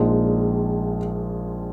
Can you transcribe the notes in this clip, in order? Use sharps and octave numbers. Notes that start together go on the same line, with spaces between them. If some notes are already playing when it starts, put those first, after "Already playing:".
Already playing: A#1 A#2 F3 G#3 D#4